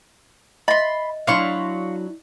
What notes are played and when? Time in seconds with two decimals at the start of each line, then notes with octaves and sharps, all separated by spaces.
0.68 D#5 E5 B5 C6
1.27 F#3 D4 E4 F5 C6 C#6